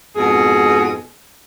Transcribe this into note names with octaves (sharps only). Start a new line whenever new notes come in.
F2 G#2 B2 G#4